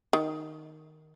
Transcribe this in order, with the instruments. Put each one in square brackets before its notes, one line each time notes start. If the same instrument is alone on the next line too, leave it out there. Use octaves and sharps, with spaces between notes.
[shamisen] D#3